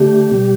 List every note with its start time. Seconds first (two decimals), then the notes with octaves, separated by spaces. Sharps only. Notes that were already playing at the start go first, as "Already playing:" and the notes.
Already playing: D3 A3 G4
0.31 B2 G3